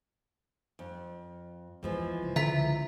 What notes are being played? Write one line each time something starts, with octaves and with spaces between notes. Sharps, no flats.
F2
E2 E3 F3 G#3
C#2
D3 E5 A#5 B6